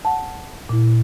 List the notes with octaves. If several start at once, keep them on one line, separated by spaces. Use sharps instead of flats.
F#5 A5
A#2 E4